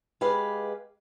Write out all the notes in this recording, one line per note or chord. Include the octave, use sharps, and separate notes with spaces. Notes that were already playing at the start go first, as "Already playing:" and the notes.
G#3 G4 B4 F5